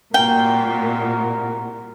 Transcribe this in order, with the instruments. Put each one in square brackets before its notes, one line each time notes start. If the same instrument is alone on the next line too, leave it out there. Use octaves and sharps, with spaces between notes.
[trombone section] C2 F#4 A#4 [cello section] A#2 [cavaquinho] G5